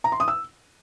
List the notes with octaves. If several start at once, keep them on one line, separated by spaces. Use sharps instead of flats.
A#5
C6
D#6
E6